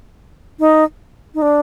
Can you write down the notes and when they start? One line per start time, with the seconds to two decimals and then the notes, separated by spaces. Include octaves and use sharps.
0.60 D#4
1.35 D#4
1.42 D4